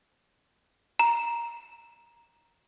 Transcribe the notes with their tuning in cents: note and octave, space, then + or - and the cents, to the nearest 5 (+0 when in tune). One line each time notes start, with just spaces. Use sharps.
A#5 +10